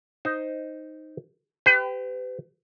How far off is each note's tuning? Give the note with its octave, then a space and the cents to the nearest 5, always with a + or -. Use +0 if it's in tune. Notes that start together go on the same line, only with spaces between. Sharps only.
D#4 +0 C5 +0
G4 +0 B4 +40